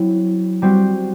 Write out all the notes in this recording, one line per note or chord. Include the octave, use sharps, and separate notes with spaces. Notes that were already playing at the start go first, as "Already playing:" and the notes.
Already playing: F#3 C4 E4
G3 C4 F#4